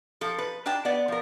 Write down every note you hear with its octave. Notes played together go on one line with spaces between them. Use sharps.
F3 A4
B4
D4 G5 A5
B3 D5
F3 A#4